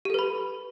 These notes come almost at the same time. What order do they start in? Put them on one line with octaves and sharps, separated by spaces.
G4 A4 B4 B5